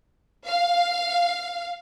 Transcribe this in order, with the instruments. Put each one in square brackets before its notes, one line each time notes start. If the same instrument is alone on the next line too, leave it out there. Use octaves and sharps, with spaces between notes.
[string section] F5